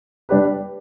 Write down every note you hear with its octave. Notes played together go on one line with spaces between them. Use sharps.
G3 D4 G4 B4